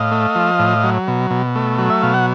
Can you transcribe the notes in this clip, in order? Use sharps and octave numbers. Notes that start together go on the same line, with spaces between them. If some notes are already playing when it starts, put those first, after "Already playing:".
Already playing: A2 D#5 F5
A3
F3
A2
F#3
B2
B2
A3
F#3
E5
B2 F5
F#5